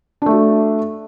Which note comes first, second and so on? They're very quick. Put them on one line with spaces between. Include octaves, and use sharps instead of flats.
D4 A3 F#4